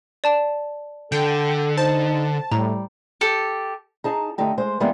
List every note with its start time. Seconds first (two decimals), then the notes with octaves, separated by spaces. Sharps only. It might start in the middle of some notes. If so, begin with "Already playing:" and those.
0.24 D5 A5 E7
1.12 D3 A4 G5
1.77 D#4 C5 A5
2.52 A2 G3 A#5
3.21 G4 A4
4.04 D#4 G#4 A5 A#5
4.38 D3 A3 D#4 G4
4.58 G#3 C5
4.80 E3 G3 G#3 A#3 B3 D#4